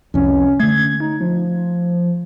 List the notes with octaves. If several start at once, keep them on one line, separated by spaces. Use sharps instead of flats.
C2 F2 C#4
D3 A3 G#6
D#4
F3